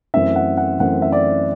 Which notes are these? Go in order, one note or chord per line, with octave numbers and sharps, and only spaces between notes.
F#2 E3 A3 C4 E5
F#5
F#5
F#2 E3 A3 C4 F#5
E5
D5